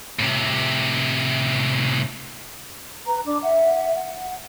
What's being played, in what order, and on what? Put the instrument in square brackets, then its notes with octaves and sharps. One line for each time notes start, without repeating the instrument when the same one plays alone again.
[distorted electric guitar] A2 C3
[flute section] B4 A#5
D4 D5 D6
E5 F#5
F#5